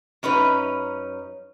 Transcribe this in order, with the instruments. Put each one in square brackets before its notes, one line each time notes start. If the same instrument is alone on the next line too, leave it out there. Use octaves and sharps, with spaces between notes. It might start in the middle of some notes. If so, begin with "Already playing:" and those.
[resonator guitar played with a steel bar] F#2 C#4 D#4 B4